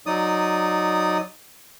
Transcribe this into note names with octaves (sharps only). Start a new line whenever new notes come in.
F#3 D#4 D5 D#6